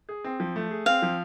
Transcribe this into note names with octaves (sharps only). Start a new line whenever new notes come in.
G#4
C4
F3
A3
G#4
C4 F5
F3